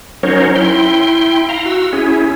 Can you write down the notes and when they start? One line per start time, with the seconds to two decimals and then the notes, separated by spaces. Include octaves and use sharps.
0.23 F#3 C#4 D#4 A#4 C5 C#5
0.55 E4 G5 C6
1.49 F5 A#5
1.66 F#4 E6
1.93 C#4 E4 G#4